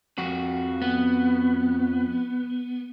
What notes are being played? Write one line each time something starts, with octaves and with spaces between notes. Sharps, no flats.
F2 F#4
B3